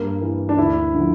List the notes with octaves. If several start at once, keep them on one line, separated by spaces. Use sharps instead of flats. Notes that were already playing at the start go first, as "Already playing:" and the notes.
Already playing: G2 A#3
E3
D4
D2 E4
D3 F3